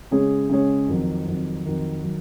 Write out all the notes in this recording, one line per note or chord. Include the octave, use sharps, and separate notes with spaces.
C#3 G#3 C#4 G#4 C#5
C#3 G#3 C#4 G#4 C#5
F2 D#3 F#3
F2 D#3 F#3
F2 D#3 F#3
D#3 F#3